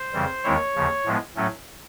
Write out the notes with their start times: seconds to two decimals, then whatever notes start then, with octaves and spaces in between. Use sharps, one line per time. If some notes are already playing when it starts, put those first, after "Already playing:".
Already playing: C5
0.13 F2 C#3 E3 G3
0.44 D#2 D#3 G#3 C4 E4 C#5
0.75 D#2 C#3 F3
1.05 A2 F3 G#3 B3
1.36 A2 F#3 A3 C#4